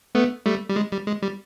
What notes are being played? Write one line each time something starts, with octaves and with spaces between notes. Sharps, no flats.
A3 B3
G3 A3
G3
G#3
G3
G#3
G3